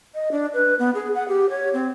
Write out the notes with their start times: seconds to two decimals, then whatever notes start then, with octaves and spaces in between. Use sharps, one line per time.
0.15 D#5
0.32 D4
0.54 B4
0.79 B3
0.95 G#4
1.15 F#5
1.28 G4
1.50 C#5
1.73 C4